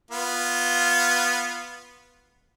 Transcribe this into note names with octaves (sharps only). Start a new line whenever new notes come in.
B3 F4